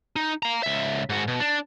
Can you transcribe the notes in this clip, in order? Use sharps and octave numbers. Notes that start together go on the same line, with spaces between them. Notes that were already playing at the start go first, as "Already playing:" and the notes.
D#4
F5 A#5
C#2 E5
G#2 F#4
B2
D4